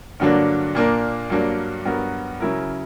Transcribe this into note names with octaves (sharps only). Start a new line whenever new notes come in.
G2 D3 F#3 A#3 D4
A#2 A#3 D4 A#4
G2 F#3 A#3 D4
G2 F#3 B3 F#4 A#4
C#3 F#3 C#4 E4 A#4